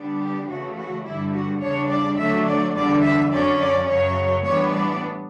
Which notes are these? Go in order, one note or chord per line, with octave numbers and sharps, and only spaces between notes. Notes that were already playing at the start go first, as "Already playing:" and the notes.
Already playing: D3 G3 B3 D4
G4
E2 C#3 E3 A3 F#4
F#4
G2 D3 G3 E4
F#4
E2 C#3 G3 D4 C#5
D5
D3 F#3 A3 D4 E5
D5
E2 D3 G3 D5
E5
F#2 D3 F#3 C#4 D5
D5
F#2 C#3 F#3 C#5
A2 E3 G3 B3 D4 C#5
D5